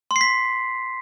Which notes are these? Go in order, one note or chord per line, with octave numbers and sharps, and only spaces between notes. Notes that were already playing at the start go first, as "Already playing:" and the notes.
C6
C7
B6